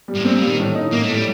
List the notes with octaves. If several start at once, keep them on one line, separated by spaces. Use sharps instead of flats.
G3
A2
A#2 C4
A#2
G3
D#3
A2
D#4
A2 A#3
A3
A2 G3